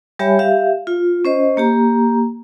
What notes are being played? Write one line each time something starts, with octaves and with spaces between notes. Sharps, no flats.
G3 G4 C#5 E5 G#5 B5
G4 E5 F5
F4
C#4 C5 D#5
A#3 G4 A#5